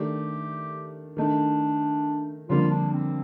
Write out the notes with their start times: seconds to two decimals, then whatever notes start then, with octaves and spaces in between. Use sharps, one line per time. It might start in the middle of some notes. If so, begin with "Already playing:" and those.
Already playing: D#3 A3 D4 G4
1.17 D#3 A3 D4 D#4
2.48 F2 D3 G3 A#3 F4
2.70 D4
2.92 C4